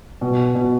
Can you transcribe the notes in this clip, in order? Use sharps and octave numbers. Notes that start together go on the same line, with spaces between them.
B2
B2